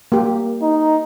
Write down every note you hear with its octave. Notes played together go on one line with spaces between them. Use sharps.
A#3 G4
D#4